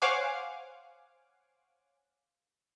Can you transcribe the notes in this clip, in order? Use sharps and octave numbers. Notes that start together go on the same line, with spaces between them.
C5 C#5 F5 F#5 G#5 D6